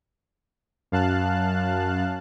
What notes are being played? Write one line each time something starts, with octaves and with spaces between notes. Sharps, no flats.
F#2 F5 A5 F#6